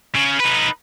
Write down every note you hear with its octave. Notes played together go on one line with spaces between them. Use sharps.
C#3
D#4 B4